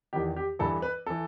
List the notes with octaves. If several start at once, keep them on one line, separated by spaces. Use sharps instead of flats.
E2 D#3 G4
G4
G2 E3 A4
B4
E3 A4